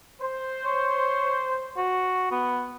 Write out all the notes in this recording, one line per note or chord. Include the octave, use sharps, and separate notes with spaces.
C5
C#5
F#4
B3